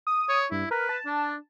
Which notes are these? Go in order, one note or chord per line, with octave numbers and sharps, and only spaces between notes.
D#6
C#5
G2 E4
A#4 B4
A5
D4